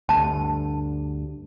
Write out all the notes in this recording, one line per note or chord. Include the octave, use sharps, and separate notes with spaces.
D2 G2 D3 A5